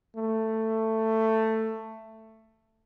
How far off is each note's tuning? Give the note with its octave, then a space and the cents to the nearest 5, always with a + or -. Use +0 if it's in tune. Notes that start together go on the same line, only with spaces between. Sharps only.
A3 +10